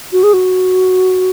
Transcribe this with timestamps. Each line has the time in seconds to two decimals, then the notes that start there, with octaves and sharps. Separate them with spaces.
0.13 F#4
0.23 G#4
0.33 F#4